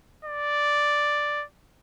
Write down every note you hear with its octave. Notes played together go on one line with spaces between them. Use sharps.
D5